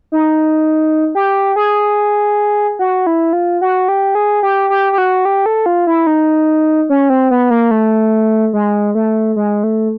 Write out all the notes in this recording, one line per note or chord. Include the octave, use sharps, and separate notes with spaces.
D#4
G4
G#4
F#4
E4
F4
F#4
G4
G#4
G4
G4
G4
F#4
G4
A4
F4
E4
D#4
C#4
C4
B3
A#3
A3
G#3
A3
G#3
A3